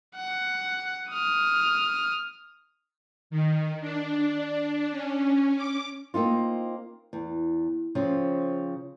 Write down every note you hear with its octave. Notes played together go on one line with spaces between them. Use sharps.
F#5
D#6 F6
D#3
D4
C#4
D6
A#3 C4 D#4 F4
E2
C#3 F3 C4